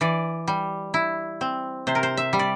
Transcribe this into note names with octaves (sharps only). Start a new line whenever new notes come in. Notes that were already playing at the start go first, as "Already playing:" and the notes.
E3 D5
G3
E4
C4
C3 C5
A#4
C5
E5
G3
D5